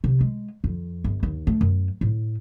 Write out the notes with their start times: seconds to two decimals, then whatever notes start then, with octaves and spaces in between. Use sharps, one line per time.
0.04 C3
0.21 G#3
0.64 F2
1.04 G1
1.23 D#2
1.47 A3
1.61 F#2
2.01 A2